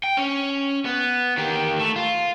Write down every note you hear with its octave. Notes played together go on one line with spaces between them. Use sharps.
G5
C#4
B3
D#3 G4
A3
F4